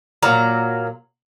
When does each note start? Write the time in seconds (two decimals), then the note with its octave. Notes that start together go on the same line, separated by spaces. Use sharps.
0.23 A#2 F#3 F5 A#5